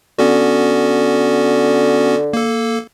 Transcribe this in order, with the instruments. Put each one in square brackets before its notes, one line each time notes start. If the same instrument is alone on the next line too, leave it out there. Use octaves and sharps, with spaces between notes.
[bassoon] D3 [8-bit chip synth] B3 C#4 F#4
[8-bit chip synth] A#3 A4